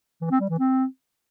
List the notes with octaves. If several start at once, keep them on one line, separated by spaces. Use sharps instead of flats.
E3
C4
G3
E3
C4